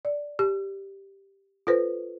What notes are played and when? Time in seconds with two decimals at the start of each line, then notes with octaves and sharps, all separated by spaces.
0.05 D5
0.39 G4
1.67 F4 A4 B4 C5